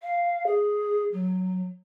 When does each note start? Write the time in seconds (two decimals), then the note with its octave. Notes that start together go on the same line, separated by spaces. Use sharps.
0.01 F5
0.46 G#4
1.12 F#3